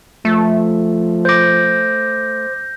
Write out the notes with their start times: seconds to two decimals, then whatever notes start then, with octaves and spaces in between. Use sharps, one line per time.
0.25 F3 A3
1.25 C5 D6 G6 A#6